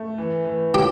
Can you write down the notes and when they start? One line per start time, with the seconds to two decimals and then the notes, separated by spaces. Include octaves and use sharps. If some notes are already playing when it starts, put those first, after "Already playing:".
Already playing: A3
0.18 E3
0.45 E3
0.74 C#4 G4